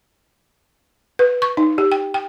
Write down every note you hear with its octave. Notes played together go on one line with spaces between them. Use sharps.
B4
C#6
D#4
G4
G5
G5